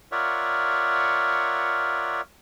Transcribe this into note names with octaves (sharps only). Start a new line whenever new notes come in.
F4 A#4 C#5 D5 E5 F#5